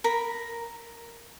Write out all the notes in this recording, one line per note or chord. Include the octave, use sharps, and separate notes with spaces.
A#4 B5